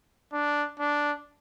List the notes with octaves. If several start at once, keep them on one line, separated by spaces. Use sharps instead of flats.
D4
D4